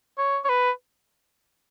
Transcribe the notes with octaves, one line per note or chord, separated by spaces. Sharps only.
C#5
C#5
B4